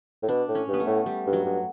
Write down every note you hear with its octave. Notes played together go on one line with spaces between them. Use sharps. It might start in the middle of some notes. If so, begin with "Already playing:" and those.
A2
B2 D4
A2
C#4
G2
B3
A3
A2
G3
G2
F#3
G2